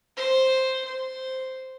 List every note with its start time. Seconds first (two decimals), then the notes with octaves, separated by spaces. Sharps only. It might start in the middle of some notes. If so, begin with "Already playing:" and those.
0.17 C5
0.86 C5